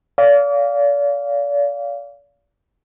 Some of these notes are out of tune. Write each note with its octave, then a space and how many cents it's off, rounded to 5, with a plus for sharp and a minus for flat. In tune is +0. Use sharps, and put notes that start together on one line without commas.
D5 -40 F5 +0